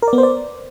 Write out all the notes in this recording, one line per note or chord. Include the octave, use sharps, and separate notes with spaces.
A#4
D5
B3
C5
D5